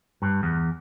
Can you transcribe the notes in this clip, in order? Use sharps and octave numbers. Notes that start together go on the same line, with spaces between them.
G2
E2